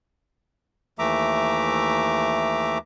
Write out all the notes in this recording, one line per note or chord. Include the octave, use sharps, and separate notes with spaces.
D#2 E3 A3 E5 A#5 D6